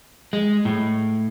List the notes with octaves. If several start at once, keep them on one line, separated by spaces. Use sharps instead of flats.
G#3
A2